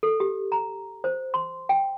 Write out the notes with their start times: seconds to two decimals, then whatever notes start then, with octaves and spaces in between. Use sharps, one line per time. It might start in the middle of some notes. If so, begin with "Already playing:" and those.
0.03 A4
0.20 G4
0.52 A#5
1.04 C5
1.34 C6
1.69 G5